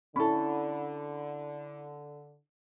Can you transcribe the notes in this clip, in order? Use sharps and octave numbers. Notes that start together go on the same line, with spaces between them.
D3 C#4 E4 A4 B5